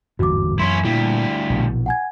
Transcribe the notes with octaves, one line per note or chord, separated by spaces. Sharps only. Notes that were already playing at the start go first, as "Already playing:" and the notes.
G1 E2 G#2 F#4 D6
F#2 E3 C#4 E4 C6
D2 A#2 G3 E4
A#1 B2
F#5 G#5 G#6